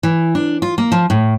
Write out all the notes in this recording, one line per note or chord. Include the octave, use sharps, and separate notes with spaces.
E3
D4
F4
A#3
F3
A2